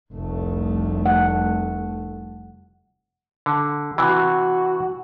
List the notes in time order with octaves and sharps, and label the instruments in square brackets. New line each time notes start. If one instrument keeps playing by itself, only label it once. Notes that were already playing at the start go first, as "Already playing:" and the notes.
[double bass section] F1 C2 A3
[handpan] F#5
[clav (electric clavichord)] D3
[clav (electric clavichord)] C3 E3 [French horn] F#4